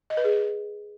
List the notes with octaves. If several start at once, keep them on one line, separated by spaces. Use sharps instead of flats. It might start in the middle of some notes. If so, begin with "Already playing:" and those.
D#5
B4
G#4